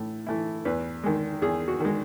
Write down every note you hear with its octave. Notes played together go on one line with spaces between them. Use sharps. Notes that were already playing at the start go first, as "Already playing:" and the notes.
Already playing: A2 E3
E3 A3 E4
E2 B4
D#3 G#3
E2 G#4
F#4
D#3 G#3